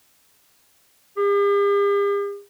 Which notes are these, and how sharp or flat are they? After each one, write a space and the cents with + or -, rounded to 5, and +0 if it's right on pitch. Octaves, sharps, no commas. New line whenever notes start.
G4 +45